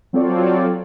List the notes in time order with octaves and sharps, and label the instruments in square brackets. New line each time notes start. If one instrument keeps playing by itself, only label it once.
[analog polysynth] F#3 C4 F4 A4 C#5 D5